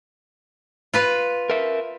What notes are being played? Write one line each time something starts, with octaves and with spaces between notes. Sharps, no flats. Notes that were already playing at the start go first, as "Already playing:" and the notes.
F4 B4 F5
A#4 E5